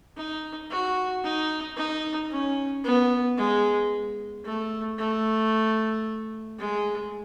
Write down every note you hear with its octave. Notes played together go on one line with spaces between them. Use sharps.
D#4
F#4
D#4
D#4
C#4
B3
G#3
A3
A3
G#3